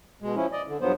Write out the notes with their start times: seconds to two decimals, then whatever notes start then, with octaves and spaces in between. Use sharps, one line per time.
0.22 B2 G#3
0.35 F3 C#4 E4
0.52 D5 D#5
0.67 D3
0.81 G2 F3 F#3 B3 C5